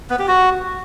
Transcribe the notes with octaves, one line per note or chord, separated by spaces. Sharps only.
B3
G4
F#4